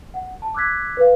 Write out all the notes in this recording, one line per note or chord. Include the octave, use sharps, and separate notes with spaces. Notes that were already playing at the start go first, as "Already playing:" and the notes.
F#5
A5
D6 E6 F#6 G#6 B6
B4 F5